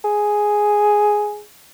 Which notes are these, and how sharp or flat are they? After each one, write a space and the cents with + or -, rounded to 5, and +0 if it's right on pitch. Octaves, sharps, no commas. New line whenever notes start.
G#4 +5